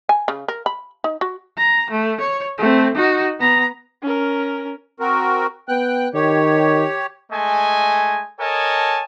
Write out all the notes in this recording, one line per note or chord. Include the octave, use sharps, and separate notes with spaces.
G#5
C#3
A#4
B5
D#4
F#4
A#5
A3
C#5
A3 C4
D#4 F#4
B3 A#5
C#4 A#4
C4 F#4 A#4
B3 G5 F#6
D#3 G4 C#5
G#3 A3 D#5 G#5
A4 A#4 C#5 D#5 G#5 A5